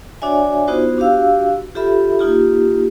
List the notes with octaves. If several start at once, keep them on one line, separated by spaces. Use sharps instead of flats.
D4 F#4 C#5 D5 E5 G#5
B3 D#4 F4 F#4 C5
D4 F#4 G4 F5 E6
F4 G4 A4 E5 B5
A#3 D#4 F4 G4